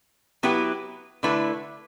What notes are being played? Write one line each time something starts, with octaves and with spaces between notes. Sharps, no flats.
F#3 B3 E4 G4 B4
D3 A3 E4 B4